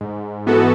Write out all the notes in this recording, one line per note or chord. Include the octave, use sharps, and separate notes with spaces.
G#2
E3 B3 F#4 A4